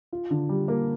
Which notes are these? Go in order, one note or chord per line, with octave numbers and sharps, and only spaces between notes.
F4
D3
G3
A#3